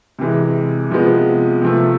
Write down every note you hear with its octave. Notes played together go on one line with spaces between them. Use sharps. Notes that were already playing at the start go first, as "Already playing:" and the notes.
C3 E3 G#3
C3 F3 G#3 B3
C3 F3 A3